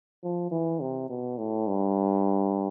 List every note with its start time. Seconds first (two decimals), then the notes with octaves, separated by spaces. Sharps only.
0.23 F3
0.51 E3
0.81 C3
1.10 B2
1.38 A2
1.67 G2